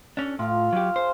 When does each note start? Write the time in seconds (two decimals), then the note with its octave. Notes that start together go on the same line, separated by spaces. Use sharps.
0.17 C#4 D4 A4
0.39 A2 F4 F5
0.73 F#3 G4
0.96 G#4 C5 C6